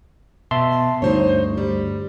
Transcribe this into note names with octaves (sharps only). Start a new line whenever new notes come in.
B2 E5 A5 C6
D2 G2 D#4 C5 C#5
G3